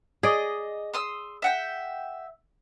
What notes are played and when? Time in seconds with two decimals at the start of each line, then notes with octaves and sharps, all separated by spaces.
0.23 G#4 D5 D#5
0.94 C6 D#6 E6
1.42 E5 F#5 G5